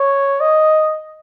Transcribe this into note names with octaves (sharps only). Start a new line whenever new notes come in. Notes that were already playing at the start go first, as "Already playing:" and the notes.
Already playing: C#5
D#5